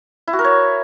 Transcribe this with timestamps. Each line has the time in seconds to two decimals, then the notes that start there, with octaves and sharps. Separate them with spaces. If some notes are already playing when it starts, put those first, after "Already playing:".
0.27 E4
0.33 F#4
0.39 A#4
0.44 C#5